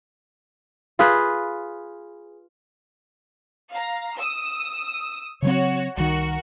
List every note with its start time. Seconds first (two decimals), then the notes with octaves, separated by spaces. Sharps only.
0.99 F4 G#4 B4
3.71 F5 A#5
4.18 D#6 E6
5.42 C#3 F#3 C4 F#4 C#5
5.97 C2 D#3 F#4 A#4